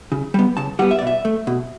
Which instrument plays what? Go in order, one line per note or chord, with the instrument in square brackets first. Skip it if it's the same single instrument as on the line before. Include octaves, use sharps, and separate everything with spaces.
[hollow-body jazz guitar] C#3
G3 B3
C#3 A5
G3 B3 F#5
E5
D5
B2
E5
A3
B2